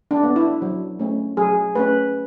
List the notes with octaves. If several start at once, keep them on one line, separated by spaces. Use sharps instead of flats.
D4
B3
E4
F#3
A3 C#4
F#3 G#4
A3 C#4 B4